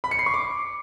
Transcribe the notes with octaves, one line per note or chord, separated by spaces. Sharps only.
B5
C#7
C7
C#6
D6